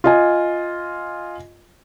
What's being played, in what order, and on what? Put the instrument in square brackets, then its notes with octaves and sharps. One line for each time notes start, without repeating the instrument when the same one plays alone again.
[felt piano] F4 D#5 G#5